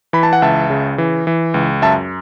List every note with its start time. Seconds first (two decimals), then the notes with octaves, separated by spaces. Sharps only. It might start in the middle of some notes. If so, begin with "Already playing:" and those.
0.13 E3 B5
0.23 A5
0.33 F#5
0.42 C#2 E5 A5
0.70 C#3
0.98 E3
1.27 E3
1.54 C#2
1.82 F#2 E5 A5